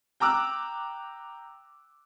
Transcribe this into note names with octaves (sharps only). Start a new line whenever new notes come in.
G5 A#5 D6 E6 F#6